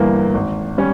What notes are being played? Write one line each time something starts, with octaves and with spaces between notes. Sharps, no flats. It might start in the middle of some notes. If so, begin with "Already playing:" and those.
Already playing: G1 G2 E3 A#3
G#1
G3 C#4